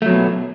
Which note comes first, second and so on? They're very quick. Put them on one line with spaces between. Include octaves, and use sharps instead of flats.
A3 F#3 B2